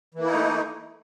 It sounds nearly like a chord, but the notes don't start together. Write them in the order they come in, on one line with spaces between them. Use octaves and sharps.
E3 A#3 E4 D#4 A3